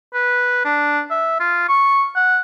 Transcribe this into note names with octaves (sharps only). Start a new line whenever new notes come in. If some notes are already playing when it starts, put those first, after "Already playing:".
B4
D4
E5
F4
C#6
F#5